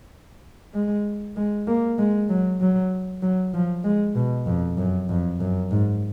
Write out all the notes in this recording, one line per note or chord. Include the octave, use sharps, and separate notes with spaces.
G#3
G#3
A#3
G#3
F#3
F#3
F#3
F3
G#3
B2
F2
F#2
F2
F#2
G#2